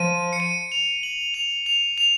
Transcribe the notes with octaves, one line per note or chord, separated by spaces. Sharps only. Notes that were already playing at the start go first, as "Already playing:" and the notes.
Already playing: F3 D#7
C#7
D#7
F7
F#7
F7
F7
F7